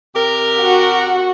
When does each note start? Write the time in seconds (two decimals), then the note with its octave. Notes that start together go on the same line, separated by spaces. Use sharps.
0.15 C3 G4 A#4
0.61 F#4